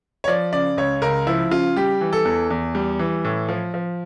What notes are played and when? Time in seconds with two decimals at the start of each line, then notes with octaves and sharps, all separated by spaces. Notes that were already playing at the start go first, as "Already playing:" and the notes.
0.24 C#5
0.28 F3 D5
0.52 C#3 D5
0.77 C#2 C#5
1.02 C#2 A#4
1.27 F3 E4
1.51 C#3 F4
1.76 G3 G4
2.01 E3
2.13 A4
2.25 E2
2.50 E2
2.75 G3
2.99 E3
3.25 A2
3.49 F3
3.74 F3